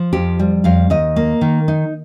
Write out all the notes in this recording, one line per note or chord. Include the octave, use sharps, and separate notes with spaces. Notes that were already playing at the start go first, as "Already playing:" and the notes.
Already playing: F3
F2 G4
G3
F2 F5
D#2 D#5
A#3
D#3
D#4